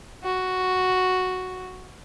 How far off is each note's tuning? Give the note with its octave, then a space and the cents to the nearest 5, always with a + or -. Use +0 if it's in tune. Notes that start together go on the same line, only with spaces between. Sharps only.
F#4 +0